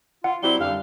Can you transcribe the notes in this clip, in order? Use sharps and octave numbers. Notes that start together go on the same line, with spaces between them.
F4 F#5
F#3 G3 C4 E4 G7
F#2 D3 G3 F5